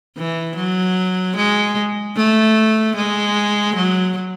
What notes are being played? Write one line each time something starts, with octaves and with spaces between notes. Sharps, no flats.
E3
F#3
G#3
A3
G#3
F#3